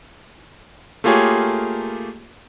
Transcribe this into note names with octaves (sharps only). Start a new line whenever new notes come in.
A3 A#3 F4 G4 G#4 C#5